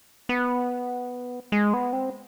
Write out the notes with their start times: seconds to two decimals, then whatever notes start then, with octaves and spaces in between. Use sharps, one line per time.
0.29 B3
1.52 G#3
1.74 B3
1.93 C4